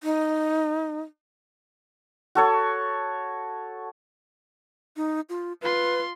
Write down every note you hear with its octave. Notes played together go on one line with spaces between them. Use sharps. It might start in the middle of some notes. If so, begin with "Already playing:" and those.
D#4
F#4 A4 C#5
D#4
F4
F4 B4 C6